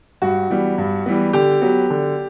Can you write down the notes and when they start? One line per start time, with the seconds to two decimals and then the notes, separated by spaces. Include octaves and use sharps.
0.22 G2 F#4
0.50 E3 G3 B3
0.78 G2
1.06 E3 G3 B3
1.33 D3 G4
1.61 F#3 B3
1.90 D3